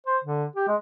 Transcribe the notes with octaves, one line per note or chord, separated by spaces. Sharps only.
C5
D3
G4
G#3